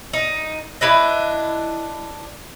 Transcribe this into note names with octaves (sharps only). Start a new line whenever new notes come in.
D#4
D4 E4 B4 D#5